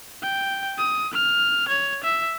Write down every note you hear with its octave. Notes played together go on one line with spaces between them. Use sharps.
G5
D#6
F6
C#5
E5